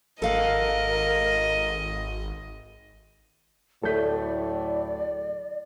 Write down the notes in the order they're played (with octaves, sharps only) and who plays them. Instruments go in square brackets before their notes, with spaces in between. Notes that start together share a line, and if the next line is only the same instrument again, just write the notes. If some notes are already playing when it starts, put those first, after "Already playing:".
[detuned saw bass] G#1 [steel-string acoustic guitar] A4 F5 F#5 [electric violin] A#4 [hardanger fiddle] D#5
[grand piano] D1 A3 B6 [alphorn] A2 [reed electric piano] A4 G6 [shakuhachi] D5